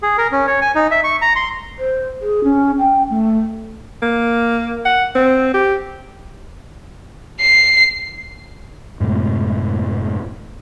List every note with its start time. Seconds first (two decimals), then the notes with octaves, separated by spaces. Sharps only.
0.03 G#4
0.18 A#4
0.32 C#4
0.47 C#5
0.62 G#5
0.75 D#4
0.91 E5
1.04 C#6
1.22 A#5
1.36 C6
1.79 C5
2.21 G#4
2.43 C#4
2.79 G5
3.10 A3
4.02 A#3
4.85 F#5
5.15 C4
5.54 G4
7.41 C7
9.00 F#2 A2 C3 G#3